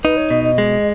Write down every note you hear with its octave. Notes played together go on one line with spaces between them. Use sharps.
D#4 B4
C#5
B2 D#5
D#5
G#3